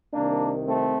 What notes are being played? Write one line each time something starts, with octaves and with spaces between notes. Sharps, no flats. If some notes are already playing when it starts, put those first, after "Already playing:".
C2 C3 D#3 A#3 D4
A3 C4